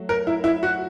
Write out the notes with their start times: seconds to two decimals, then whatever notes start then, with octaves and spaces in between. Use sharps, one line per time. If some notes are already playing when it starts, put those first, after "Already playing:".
Already playing: F#3 A3
0.09 A#4
0.27 E4
0.44 E4
0.63 F#4